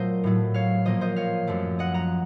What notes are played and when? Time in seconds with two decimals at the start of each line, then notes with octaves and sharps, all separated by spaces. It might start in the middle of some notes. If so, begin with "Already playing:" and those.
Already playing: A#2 F#3 A3 A#4 C5 D#5
0.24 A2 F#3 A3
0.54 C#5 F5
0.85 A#2 F3 A#3 C5 D#5
1.01 C5 D#5
1.16 C#5 F5
1.47 F#2 F3 A3
1.79 D#5 F#5
1.94 F#5 A#5